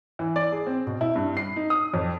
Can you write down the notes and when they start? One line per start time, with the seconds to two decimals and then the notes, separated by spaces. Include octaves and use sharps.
0.19 E3
0.36 D5
0.52 G#4
0.67 C4
0.87 B2
1.01 E4
1.16 G2
1.37 C7
1.56 D#4
1.70 D#6
1.94 F2